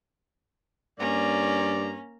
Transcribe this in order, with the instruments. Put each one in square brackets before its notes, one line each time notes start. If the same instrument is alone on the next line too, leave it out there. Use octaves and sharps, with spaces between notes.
[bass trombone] G2 [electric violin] A#3 A#5 [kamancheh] C#4 [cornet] D5